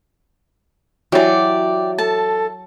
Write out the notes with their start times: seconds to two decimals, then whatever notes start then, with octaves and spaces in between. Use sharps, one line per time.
1.12 E3 F#3 E4 G4 D5
1.98 A4 A5